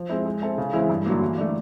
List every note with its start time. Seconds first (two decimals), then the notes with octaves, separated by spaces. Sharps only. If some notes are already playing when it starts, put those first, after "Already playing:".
Already playing: F3
0.09 G#3 C4 E4
0.26 G#3
0.42 C4 E4 A4
0.58 C#3
0.73 E3 G#3 C4 E4
0.89 G2
1.06 D3 F#3 A#3
1.21 E3
1.37 A3 D4